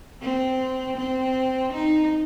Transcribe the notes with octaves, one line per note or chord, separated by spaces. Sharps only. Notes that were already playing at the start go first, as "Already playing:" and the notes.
C4
C4
D#4